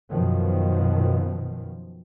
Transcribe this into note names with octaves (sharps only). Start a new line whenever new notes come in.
F#2 B2 D#3 F3